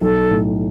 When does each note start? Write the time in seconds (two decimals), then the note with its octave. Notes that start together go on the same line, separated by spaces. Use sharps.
0.01 B1 A4
0.31 A2